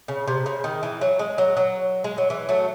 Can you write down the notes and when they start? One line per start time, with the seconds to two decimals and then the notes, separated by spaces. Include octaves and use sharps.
0.08 C#3
0.28 C3
0.46 C#3
0.64 D#3
0.83 E3
1.01 F#3
1.19 G#3
1.38 F#3
1.57 F#3
2.04 G#3
2.18 F#3
2.30 E3
2.49 F#3 A3